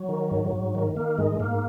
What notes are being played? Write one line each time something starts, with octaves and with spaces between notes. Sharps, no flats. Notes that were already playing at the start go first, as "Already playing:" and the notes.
Already playing: F#3
D#3
G#2
G#2
D#3
D#3 A#3
G#2 G#3
G#2 A#3